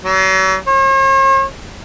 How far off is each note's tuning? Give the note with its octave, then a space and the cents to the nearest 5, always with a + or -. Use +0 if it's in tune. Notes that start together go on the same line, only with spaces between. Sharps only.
F#3 +40
C#5 -45